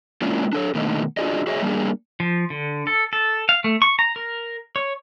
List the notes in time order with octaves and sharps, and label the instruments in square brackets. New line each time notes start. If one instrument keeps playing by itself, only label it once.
[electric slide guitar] G#3 A#3 C#4 D4 E4 F4
D4 A4 C#5
B2 D3 D#3 A3 A#3 D#4
D4 F4 F#4 G#4 D5 D#5
F#4 G#4 C#5 D#5 E5
G3 A#3 D4 G#4
[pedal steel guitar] F3
D3
A4
A4
F5
A3
C#6
A#5
A#4
C#5